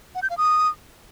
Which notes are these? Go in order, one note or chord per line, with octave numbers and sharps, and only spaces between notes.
F#5
G6
F5
D#6